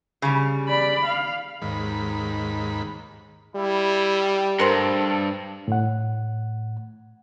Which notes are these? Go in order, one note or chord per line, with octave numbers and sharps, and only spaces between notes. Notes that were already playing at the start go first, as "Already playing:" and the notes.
C#3 G3
D5 B5
F5
D#2 G#2 B5
G3 E4
G2 A4 A#4 C5
A2 F#5